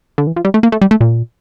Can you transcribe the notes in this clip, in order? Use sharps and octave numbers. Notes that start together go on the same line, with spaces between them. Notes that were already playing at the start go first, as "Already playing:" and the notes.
D3
E3
F3
G3
A3
A#3
A3
G3
A3
A#2